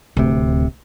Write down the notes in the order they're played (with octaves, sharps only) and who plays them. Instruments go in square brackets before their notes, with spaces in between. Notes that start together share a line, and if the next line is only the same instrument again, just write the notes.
[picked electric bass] D1 C3 [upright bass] D2